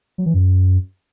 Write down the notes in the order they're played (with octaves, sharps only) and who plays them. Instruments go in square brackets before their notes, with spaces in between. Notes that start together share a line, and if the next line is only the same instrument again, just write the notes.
[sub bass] F#3
E3
F#2